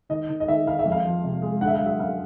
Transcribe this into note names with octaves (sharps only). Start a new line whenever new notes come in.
D#3 D#5
D#3
D#5
D#3 E5
D#3 F5
E5
F2
F5
F3
C3
G#3
D3 F#5
E5
F5
F#3
E5
F#2 F5